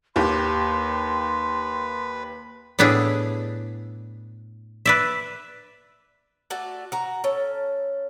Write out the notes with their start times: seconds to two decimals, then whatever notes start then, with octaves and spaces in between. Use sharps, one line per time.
0.16 D#2 G4 B4 C6
2.79 A2 B3 D4 E4 G#4
4.86 B4 D5 E5
6.50 A3 F#4 D5
6.92 F#4 A#5
7.24 C#4 A4